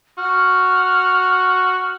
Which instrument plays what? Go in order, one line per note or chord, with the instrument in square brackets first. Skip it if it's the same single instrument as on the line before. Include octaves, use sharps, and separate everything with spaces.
[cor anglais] F#4 [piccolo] F6